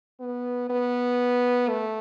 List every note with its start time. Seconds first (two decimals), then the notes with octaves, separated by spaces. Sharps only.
0.20 B3
0.70 B3
1.69 A3